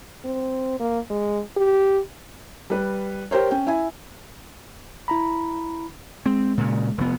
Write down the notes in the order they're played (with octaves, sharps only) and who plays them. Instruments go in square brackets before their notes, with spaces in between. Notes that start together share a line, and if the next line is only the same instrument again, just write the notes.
[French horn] C4
A#3
G#3
G4
[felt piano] G3 B4
G4 A#4 C5 C#5
C#4 G5
E4 G#5
[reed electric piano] E4 A#5 B5
[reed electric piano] G#3 [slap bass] C4
[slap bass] A#2 C#3
F1 B3